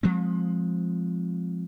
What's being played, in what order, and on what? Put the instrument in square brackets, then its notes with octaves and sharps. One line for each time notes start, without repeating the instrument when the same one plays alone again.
[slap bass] F3 G#3 C4